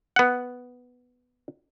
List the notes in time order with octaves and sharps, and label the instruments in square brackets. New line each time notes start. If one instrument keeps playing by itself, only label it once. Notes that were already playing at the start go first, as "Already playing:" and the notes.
[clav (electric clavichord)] B3 F#5